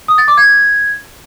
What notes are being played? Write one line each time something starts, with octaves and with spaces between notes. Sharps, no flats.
D#6
A6
D6
G#6